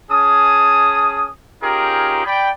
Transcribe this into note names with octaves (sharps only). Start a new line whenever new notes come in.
C#4 G#4 A5 D#6
C#4 D#4 F4 G4 G#4 A#4
D5 G5 B5